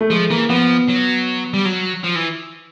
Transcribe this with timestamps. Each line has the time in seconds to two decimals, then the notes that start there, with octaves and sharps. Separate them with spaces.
0.01 A3
0.10 F3 G#3
0.30 E3 A#3
0.49 F3 B3
0.89 F#3
1.54 G3
1.65 F#3
2.04 F3
2.16 E3